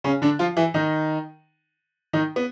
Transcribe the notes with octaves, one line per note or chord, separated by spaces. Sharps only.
C#3 C#4
D3 D4
F3 F4
E3 E4
D#3 D#4
D#3 D#4
B3